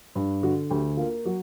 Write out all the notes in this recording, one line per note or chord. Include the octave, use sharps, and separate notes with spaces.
G2
D3 F#4
D2 G4
A#3 F4
F#3 F#4